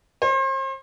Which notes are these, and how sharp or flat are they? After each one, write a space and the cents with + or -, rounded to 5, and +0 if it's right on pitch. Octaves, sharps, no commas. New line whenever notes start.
C5 +40